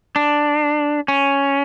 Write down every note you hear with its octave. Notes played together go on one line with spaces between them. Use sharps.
D4
C#4